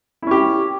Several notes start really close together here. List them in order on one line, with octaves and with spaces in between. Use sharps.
E4 C#4 G4